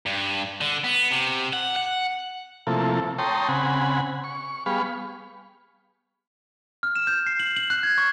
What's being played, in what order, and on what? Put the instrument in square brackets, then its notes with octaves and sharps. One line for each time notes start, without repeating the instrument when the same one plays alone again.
[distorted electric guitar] G2
D3
B3
C3
F#5
F#5
[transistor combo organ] C3 F3 A3 A#3 E4 A4
C#5 G5 A5 A#5 C6 D#6
C#3 C4 F#5 G#5 B5
C#6
G3 B3 G#4 F5 B5 C#6
[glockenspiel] F6
E7
G6
C7
F#7
F#7
F#6
G#6
C#6